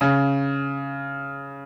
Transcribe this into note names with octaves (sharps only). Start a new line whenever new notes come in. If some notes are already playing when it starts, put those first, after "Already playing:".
C#3